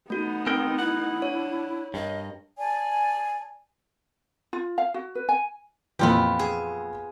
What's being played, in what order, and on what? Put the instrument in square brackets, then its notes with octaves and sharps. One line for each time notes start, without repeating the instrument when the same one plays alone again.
[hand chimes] A3 F#4 [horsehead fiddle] B3 D#4
[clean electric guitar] C4 A#4 G5
[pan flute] E4 [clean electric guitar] F#5
[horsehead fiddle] D4 [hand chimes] C#5
[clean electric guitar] G2 [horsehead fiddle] A#4 [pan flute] D#5
[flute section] D5 G#5 A5
[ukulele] F4
F5
F#4
B4
G#5
[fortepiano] F2 A#2 E3 [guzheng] B3 F4 G4
[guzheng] G#4